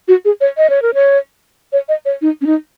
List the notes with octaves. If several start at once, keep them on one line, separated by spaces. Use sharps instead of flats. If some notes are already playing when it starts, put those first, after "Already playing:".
F#4
G#4
C#5
D#5
C#5
A#4
C#5
C#5
D#5
C#5
D#4
C#4
D#4